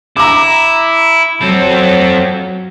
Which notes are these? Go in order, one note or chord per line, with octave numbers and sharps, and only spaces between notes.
E4 A#5 D6
F#3 C4 A4